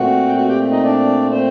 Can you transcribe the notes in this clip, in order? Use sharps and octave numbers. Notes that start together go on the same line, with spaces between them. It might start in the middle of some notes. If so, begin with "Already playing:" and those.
Already playing: A#2 A3 C4 F#4 F#5
G5
F#4 F#5
G4 G5
D#4 D#5
D4 D5
C4 C5